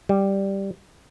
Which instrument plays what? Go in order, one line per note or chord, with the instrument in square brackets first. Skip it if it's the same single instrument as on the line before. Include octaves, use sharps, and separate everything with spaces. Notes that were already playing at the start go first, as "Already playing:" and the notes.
[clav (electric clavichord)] G3